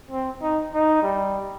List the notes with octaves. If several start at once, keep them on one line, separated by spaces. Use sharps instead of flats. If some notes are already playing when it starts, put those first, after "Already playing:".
C4
D#4
D#4
G3